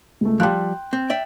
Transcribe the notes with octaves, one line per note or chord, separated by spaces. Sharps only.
C#2 A3
F3 G3 G5 C6 F#6
C4
D5 E5 G5